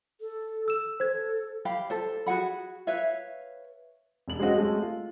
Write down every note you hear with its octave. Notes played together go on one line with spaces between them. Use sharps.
A4
E6 E7
A4 C5 G#6
G4 F5 B5
A4 C5
F#4 G#4 F#5 B5
B4 C#5 E5 F5
E1 F#7
G#3 C4 C#4 F#4 D#5
G#3 A3
F4